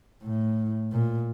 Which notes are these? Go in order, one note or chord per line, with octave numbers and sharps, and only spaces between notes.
A2
A#2